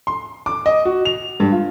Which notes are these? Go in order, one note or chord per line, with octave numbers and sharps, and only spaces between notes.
C6
D6
D#5
F#4
F7
G2
F4